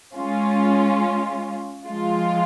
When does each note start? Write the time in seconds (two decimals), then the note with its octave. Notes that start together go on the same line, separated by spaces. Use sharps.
0.15 G#3 C#4 F4
1.86 F3 G#3 F4